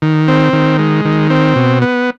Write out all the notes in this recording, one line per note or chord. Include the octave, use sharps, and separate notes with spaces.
D#3
C4
D#3
G#3
D#3
C4
B2
B3